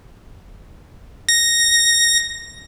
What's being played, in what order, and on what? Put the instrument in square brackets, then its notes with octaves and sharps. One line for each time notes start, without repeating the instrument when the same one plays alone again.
[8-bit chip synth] A#6